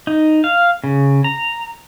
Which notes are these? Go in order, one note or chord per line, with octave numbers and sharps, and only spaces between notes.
D#4
F5
C#3
A#5